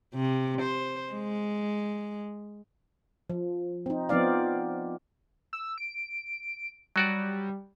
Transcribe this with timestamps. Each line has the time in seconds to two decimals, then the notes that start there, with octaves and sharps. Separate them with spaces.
0.14 C3
0.62 C5
1.12 G#3
3.30 F3
3.86 C4 D#4
4.09 F3 B3 C4 D#4 D5 F5
5.53 E6
5.78 D7
6.96 F#3 G3 F#4 D5